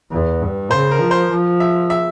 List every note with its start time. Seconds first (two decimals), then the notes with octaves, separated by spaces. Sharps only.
0.11 E2
0.41 G2
0.71 C#3 C5
0.91 A#4
1.01 F3
1.11 C5
1.30 F3
1.60 E5
1.90 E5